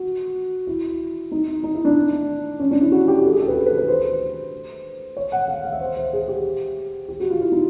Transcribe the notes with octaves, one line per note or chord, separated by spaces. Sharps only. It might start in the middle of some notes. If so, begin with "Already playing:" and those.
Already playing: F#4
E4
D#4
D#4
E4
D4
C#4
D4
E4
F#4
G4
A4
G#4
A4
B4
A4
B4
B4
C5
C#5
F#5
F5
F5
E5
C5
C5
G#4
G4
G4
F#4
F4
E4
D#4